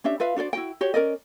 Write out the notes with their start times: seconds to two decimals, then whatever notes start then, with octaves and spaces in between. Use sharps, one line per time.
0.04 C#4 D4 G4 E5
0.20 F4 B4 E5 F5
0.36 D4 F#4 C5 D5
0.53 E4 F#4 G5
0.81 F#4 G4 C5 C#5
0.94 C#4 A#4 D5 D#5